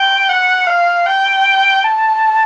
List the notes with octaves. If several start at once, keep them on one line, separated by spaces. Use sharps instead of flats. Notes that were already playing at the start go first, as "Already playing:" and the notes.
Already playing: G5
F#5
F5
G5
A5